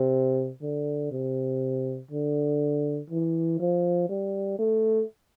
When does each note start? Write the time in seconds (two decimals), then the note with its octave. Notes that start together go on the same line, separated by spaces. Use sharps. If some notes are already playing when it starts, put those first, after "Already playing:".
Already playing: C3
0.62 D3
1.11 C3
2.11 D3
3.10 E3
3.60 F3
4.09 G3
4.59 A3